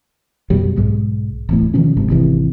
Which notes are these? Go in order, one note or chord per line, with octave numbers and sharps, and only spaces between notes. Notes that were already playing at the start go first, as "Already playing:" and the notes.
F#2 B2 F#3 G3
B1 G#2 G#3
D1 E2 A2
B2 D#3 F3 C#4
G1 G#2 C3
G#1 D#2 C3 E3